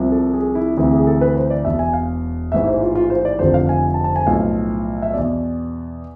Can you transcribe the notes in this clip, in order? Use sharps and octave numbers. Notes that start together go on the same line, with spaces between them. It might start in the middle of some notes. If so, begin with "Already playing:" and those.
Already playing: C2 C3 F3
A4
G#4
E4
D2 C3 E3 E4
G#4
A4
B4
C5
D5
E1 E2 B2 E5
G#5
F5
A1 G#2 E3 E5
C5
F4
F4
C5
D5
F1 F2 D3 F3 C5
F5
G#5
A5
A5
G#5
B1 A2 F3 F5
E5
E2 B2 D5